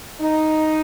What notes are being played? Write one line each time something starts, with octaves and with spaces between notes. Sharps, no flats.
D#4